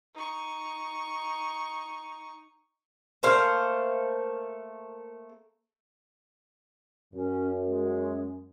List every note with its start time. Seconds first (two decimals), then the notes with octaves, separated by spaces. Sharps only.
0.14 D#4 C#6
3.23 A3 A#3 C5 F5
7.14 F#2 C#4
7.67 G#3